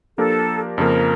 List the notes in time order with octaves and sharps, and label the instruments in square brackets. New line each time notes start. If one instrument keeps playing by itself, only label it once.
[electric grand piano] F3 A#3 D4 G4 A#4 [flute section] A4
[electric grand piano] F2 C#3 F3 A#3 [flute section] A#4